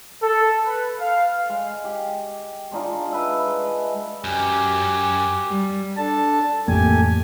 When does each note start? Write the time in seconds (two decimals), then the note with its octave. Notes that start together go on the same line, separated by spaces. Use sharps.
0.22 A4
0.66 B4
0.98 F5
1.49 G#3
1.84 G4
2.71 G#3 D4 D#4 F4
3.12 B4 E5
3.47 G#3
4.25 F#2 G4 G#5
5.48 G3
5.97 D4 A4 A5
6.68 A1 F2 A3 A#3 G4 G#5